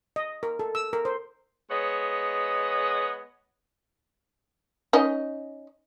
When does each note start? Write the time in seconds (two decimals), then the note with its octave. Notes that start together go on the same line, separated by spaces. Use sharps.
0.16 D#5
0.43 A#4
0.59 A4
0.75 E6
0.93 A#4
1.05 C5
1.71 G#3 B3 C#5 D#5
4.93 C#4 D#4 D#5